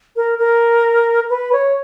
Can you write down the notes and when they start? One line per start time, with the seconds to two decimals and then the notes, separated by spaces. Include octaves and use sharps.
0.16 A#4
0.39 A#4
1.29 B4
1.53 C#5